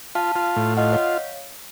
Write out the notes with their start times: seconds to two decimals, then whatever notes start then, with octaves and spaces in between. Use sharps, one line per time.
0.15 F4 F5 A5
0.36 F4
0.56 A2
0.77 F4 D#5 F#5
0.92 C#5 F5